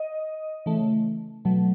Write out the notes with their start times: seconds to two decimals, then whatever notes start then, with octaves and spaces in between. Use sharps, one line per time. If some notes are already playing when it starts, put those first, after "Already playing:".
Already playing: D#5
0.66 C#3 E3 A3
1.45 B2 F#3 A3